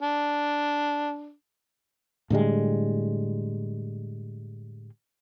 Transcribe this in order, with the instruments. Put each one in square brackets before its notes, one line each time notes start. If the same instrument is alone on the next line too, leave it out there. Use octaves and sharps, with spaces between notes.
[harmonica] D4
[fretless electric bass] A2 D3 G3 G#3